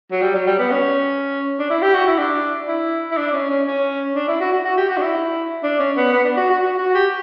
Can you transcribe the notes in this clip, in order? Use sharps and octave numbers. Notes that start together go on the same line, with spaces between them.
F#3
G3
F#3
G3
B3
C#4
D4
E4
G4
F#4
E4
D4
E4
E4
D4
C#4
C#4
C#4
D4
E4
F#4
F#4
F#4
G4
F#4
D4
E4
D4
C#4
B3
B3
D4
F#4
F#4
F#4
F#4
G4